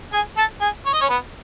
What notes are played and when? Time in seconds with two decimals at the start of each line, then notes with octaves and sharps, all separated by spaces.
0.13 G#4 G#5
0.37 A4 A5
0.61 G#4 G#5
0.85 C#5
0.93 D#5
1.01 C#4 C#5
1.09 B3 B4